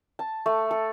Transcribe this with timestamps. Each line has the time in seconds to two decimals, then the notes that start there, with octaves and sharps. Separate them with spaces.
0.19 A5
0.46 A3
0.71 A4